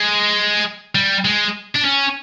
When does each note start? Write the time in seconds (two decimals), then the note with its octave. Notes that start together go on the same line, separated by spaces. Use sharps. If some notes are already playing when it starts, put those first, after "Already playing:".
Already playing: G#3
0.95 G3
1.25 G#3
1.76 D4
1.85 C#4